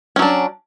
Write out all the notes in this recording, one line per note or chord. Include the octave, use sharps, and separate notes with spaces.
F#3 C#4 D4